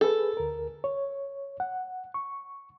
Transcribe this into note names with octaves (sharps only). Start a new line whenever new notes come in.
G#4 A4 B4
D2 A#4
C#5
F#5
C#6